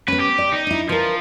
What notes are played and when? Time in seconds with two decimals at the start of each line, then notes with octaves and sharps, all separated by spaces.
0.08 B3 C#4 B4
0.20 G4
0.38 D5
0.52 D#4
0.67 D4 E4
0.89 F3 A#4 B4